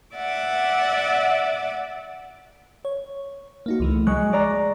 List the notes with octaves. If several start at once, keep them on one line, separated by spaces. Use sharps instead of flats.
D5 E5 F#5 D6
C#5
A#3 D#4 F#4
C#2 E3 A3
G#3 C#6 F#6
D5 A#5